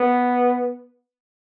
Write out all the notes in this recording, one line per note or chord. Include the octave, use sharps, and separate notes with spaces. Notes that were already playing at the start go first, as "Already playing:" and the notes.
Already playing: B3